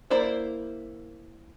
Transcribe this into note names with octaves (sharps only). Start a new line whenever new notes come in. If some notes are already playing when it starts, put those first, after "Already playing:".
A#3 E4 C5 D5